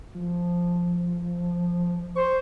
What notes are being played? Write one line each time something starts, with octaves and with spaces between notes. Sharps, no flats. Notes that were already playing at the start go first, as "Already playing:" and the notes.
F3
C5 C#6